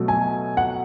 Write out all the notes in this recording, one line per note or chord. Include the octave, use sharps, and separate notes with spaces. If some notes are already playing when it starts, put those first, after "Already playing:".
Already playing: B2 F#3 A3
G#5
F#5